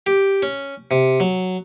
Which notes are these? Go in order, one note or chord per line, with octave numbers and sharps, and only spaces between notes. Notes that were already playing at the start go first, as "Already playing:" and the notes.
G4
C#4
C3
F#3